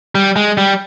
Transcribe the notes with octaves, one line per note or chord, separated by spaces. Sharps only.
G3
G#3
G3